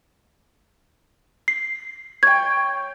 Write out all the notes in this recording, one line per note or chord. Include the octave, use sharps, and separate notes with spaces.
C7
C#5 G5 G#6